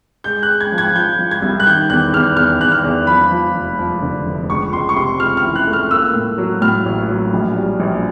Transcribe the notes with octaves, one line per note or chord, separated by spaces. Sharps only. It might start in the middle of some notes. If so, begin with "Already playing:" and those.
G#3 G6
F#6
G#3
G#6
F3
G#6
F3 G6
F3
G#6
C2
F#6
D#3 G6
E2 F#6
E2 F6
E2 F6
E2 F#6
F6
E2
F3 B5
F3
F1
F3
D3
F1
C#2 C#6
C#2 C6
C#6
C3 C6
C#2 F6
F6
E3
F#6
A3
F6
A#3 E6
A2
F#3
A2 F6
A1
F#3
A#1
G3
A#1